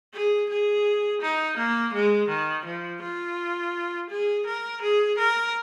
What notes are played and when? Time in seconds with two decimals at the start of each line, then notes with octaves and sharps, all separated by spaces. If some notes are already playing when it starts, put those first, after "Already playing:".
0.13 G#4
0.50 G#4
1.22 D#4
1.57 A#3
1.94 G#3
2.29 D#3
2.65 F3
3.02 F4
4.10 G#4
4.46 A#4
4.82 G#4
5.18 A#4